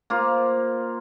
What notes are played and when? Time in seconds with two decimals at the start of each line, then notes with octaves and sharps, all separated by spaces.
0.10 A#3 F4 C5